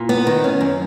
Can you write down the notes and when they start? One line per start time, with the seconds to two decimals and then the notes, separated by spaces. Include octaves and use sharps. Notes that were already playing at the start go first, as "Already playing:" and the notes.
Already playing: A#2
0.09 B3
0.27 D#3
0.44 C#4
0.61 F#2